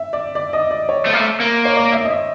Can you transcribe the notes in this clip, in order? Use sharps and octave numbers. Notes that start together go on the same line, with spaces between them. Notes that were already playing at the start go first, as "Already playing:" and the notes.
Already playing: E5
D5
D5
D#5
D5
C#5
A3 C5
A#3
A3
A#3
C#5
D5
E5
D#5
E5